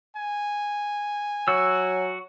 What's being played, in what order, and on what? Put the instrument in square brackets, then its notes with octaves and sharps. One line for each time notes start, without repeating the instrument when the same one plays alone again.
[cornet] G#5
[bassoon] F#3 [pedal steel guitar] F#4 E6